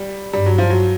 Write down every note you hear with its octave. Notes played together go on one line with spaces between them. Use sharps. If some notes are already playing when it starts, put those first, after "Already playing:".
Already playing: G3
G2 G3
F#3
F3
F#3